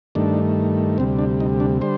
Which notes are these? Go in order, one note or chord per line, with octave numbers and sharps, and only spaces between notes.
G2 D#3 A3 D4
D2 C3 G3 C4
D4
D#4
D4
D3 G3 C5